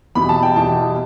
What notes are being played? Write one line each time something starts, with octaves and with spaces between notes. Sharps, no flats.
E2 B2 G3 B5
A5
G5
E2 B2 G3 A5